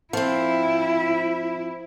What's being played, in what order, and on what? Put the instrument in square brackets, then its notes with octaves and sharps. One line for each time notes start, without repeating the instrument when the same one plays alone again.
[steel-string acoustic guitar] F3 C4 [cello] E4